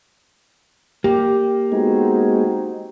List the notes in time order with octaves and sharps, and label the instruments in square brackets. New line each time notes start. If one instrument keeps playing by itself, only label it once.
[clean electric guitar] A#3 [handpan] G4
[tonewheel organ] G#3 B3 G#4 [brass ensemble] C4 D#4 F#4